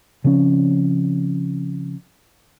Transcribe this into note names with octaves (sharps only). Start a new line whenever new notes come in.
C#3 F3 C4 C#4